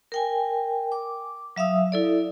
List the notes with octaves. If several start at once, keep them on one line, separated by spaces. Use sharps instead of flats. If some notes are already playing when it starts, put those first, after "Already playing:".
A#4 G5 G#5
D6
F#3 E5 F5 D#6 E6
E4 A4 D5